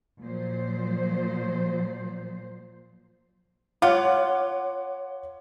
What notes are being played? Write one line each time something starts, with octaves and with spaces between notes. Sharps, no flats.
A#2 F3 F#3 C5
F4 C#5 F#5 D6